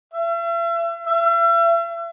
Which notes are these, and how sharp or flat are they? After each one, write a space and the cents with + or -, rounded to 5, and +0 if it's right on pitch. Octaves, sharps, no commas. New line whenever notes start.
E5 +40
E5 +40